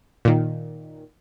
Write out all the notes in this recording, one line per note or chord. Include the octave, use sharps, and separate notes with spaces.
A#2 D#3